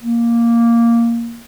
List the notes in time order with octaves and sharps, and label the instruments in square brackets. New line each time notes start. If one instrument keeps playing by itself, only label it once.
[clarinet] A#3